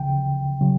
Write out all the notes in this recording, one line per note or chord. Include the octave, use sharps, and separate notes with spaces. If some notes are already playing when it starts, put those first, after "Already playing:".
Already playing: D2 C#3 F3 G5
C#3 F#3